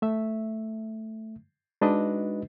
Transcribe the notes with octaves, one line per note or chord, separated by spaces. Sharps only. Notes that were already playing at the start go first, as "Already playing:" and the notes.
A3 E5
G#3 D4 D#4 F#4 B4 D#5